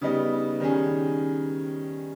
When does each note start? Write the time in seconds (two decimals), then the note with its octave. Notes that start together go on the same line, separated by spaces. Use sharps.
0.01 C#3 G3 B3 D#4
0.60 D#3 G3 C#4 G#4